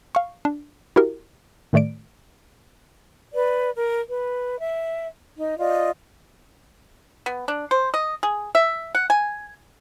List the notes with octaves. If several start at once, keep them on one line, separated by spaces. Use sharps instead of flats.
F5 C#6
D4
E4 F#4 G4 A#4
A2 D#3 A3 D5 D7
B4 D5
A#4
B4
E5
D#4
F4 D5 D#5
B3
D4
C5
D#5
G#4
E5
F#5
G#5